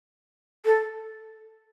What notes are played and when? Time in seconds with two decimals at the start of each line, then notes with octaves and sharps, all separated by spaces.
0.65 A4